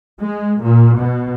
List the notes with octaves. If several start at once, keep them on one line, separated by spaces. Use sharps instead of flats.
G#3
A#2
B2